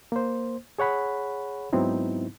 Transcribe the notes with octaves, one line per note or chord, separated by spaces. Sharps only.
A#3 C5
G#4 C#5 F#5 B5
G#2 F#3 B3 C4 D#4 E4